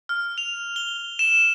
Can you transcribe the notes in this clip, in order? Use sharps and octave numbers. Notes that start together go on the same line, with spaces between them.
F6
F7
G7
E7